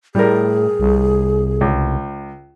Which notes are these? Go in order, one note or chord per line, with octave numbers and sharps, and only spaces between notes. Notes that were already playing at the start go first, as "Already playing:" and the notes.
A2 G3 G#4 A#4
C2
C#2